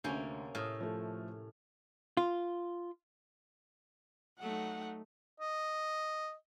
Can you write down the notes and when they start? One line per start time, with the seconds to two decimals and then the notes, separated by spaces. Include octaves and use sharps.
0.04 D2 C3 A#3 C#4 G6
0.55 A2 D#6 F6
0.80 F3 A3
2.17 F4
4.40 F#3 A3 D#4 F#5
5.40 D#5